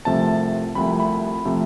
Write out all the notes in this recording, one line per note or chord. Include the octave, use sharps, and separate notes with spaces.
C2 C3 F3 A3 A5
C2 C3 F3 A3 B5
B5
C3 F3 A3